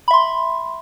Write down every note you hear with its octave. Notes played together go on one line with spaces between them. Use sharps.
E5 B5 C6